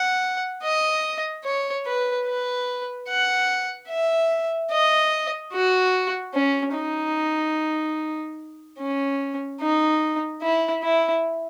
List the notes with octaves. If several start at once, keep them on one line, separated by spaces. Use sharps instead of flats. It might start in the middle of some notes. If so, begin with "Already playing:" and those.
Already playing: F#5
D#5
C#5
B4
B4
F#5
E5
D#5
F#4
C#4
D#4
C#4
D#4
E4
E4